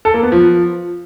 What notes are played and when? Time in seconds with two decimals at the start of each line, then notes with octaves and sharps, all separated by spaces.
0.05 A4
0.14 A#3
0.23 B3
0.32 F3